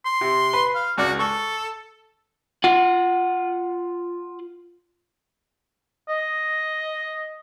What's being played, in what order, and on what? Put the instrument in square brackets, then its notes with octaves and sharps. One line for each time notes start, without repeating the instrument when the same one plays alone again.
[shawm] C6
[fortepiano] C3
B4
[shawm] F5
[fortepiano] C#2 D5 F6 [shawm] F#4
[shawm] A4 [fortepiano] C#6
[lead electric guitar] F4 F#5
[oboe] D#5